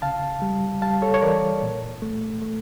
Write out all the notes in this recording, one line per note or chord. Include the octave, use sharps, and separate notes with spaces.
C#3 F5 A5
G3
G3 F5 A5
A4 C#5
C#5
E3 A#4 D5
A#2
A3
A3